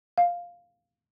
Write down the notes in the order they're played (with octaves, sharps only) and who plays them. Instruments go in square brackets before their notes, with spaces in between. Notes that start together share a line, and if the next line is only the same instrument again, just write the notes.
[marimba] F5